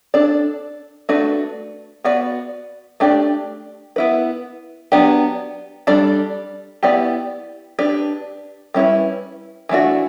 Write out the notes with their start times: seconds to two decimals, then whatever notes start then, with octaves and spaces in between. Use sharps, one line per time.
0.14 D4 A4 D5
1.09 A3 D4 F#4 B4
2.04 B3 F#4 B4 D5
3.00 A3 D4 G4 D5
3.96 B3 E4 B4
4.92 F#3 B3 D4 G4
5.87 G3 D4 A4 D5
6.83 B3 E4 G4 D5
7.79 D4 G4 B4
8.74 G3 C#4 E4 B4
9.69 E3 A3 D4 F#4